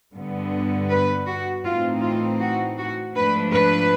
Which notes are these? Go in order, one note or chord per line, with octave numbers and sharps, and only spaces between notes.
G2 D3 G3 B3
B4
F#4
A2 E3 A3 C4 D#4 F4
F4
F#4
F#4
G#2 F3 A3 D4 B4
B4